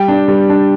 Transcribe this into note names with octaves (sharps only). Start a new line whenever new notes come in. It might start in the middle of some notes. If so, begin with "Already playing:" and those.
Already playing: G3 G5
D4
G3
D4